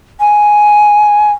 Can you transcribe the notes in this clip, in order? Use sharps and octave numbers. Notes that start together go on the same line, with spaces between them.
G#5